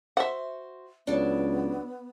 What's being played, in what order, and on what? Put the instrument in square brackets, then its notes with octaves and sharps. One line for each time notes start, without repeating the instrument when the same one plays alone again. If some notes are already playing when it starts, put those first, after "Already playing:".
[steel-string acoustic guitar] F#4 C5 [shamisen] E5 F#5
[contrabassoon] C#2 [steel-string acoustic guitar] F#3 D4 [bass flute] B3